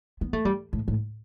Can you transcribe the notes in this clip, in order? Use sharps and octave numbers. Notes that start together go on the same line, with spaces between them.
B3
A3
G3
A2
A2